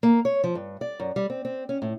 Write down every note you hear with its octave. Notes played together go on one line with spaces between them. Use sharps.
A#3
C#5
F3
G2
D5
F#2
G3
C4
C4
C#4
A2